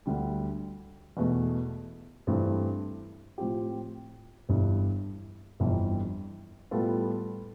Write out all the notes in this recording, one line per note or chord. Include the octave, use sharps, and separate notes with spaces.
D2 D3 G3
E2 B2 A3
G2 E3 A3 C4
A2 F3 C4 G4
G1 G2 E3
G1 F2 E3 G3
A2 G3 B3 F4 A4